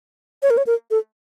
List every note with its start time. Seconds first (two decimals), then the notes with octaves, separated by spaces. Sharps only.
0.43 C#5
0.50 A#4
0.57 C#5
0.67 A#4
0.91 A4